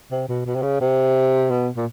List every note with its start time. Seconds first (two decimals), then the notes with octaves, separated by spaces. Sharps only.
0.11 C3
0.29 B2
0.46 B2
0.56 C3
0.63 C#3
0.81 C3
1.51 B2
1.77 A#2